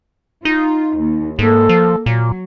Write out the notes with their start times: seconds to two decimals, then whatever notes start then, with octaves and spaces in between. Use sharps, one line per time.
0.45 D#4 F4
0.97 D#2
1.39 G#2 A#3 A4
1.69 F3
2.06 A#2 F#3